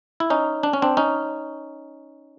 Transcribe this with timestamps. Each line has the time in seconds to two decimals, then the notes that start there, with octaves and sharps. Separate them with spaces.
0.20 E4
0.30 C#4 D#4
0.63 D4
0.73 C#4
0.82 C4 D4
0.97 C#4 D#4